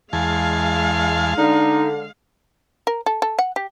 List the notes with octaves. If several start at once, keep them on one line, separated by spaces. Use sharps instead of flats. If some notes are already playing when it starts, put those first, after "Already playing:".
E2 G#3 F5 G#5 A5
D3 D#4
A#4
A4
A4
F#5
G4